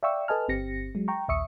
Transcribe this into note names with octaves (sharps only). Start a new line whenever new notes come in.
D5 E5 F5 G5 C#6 E6
A4 B4 D#5 G#5 A5 F6
G1 C4 G4 A#6 C#7
F#3 G#3
G5 A#5 C#6
A#1 D#2 E5 C#6 D#6 C#7